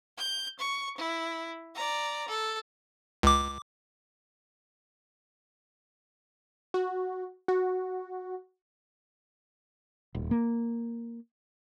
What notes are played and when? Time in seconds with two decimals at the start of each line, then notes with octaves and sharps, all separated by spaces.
0.18 G6
0.59 C#6
0.97 E4
1.75 D5 A#5
2.28 A4
3.23 C#2 D6
6.74 F#4
7.48 F#4
10.15 D#1
10.31 A#3